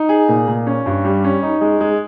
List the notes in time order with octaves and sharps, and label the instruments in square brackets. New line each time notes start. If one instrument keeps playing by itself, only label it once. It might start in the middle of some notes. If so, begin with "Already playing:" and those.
Already playing: [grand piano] D#4
G#4
A#2
A#2
C#4
G2
G3
C#4
D#4
G#3
G#3